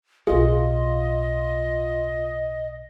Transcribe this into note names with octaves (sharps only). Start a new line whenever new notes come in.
B1 A2 F4 G#4 D#5